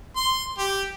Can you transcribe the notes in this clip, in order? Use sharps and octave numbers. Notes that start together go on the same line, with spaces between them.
C6
G4